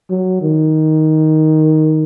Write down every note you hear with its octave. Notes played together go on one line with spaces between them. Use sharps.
F#3
D#3